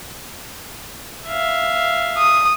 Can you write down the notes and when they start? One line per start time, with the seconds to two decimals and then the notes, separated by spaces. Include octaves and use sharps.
1.28 E5 F5
2.17 D#6